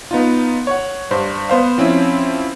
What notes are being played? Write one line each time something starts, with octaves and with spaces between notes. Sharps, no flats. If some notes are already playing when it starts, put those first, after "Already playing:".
B3 D#4 F4
C#5 F#5
G2 C5
B3 C5 F5
F3 C4 C#4 E4